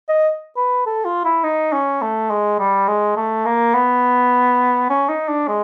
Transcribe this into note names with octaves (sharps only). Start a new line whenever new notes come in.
D#5
B4
A4
F4
E4
D#4
C#4
A3
G#3
G3
G#3
A3
A#3
B3
C#4
D#4
D4
G#3